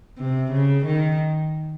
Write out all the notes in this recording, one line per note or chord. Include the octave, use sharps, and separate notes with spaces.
C3
C#3
D#3